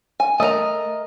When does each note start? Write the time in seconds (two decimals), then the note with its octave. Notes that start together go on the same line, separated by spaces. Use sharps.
0.20 G#5
0.40 A3 A#4 C5 D#5 A#5